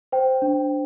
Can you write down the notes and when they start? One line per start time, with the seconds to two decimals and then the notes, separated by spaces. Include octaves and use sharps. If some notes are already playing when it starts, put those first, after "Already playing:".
0.12 C5 G5
0.42 D4